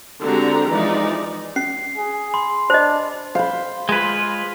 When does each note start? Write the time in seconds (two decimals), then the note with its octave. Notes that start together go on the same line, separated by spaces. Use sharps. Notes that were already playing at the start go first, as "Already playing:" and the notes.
0.23 D3 G#3 C4 F#4 G4 A#5
0.70 E3 F3 G#3 D#4 D5
1.56 C#4 C7
1.97 G#4
2.34 B5 C6
2.70 D4 C5 D#5
3.35 C5 F5 B5
3.89 G#3 F4 B4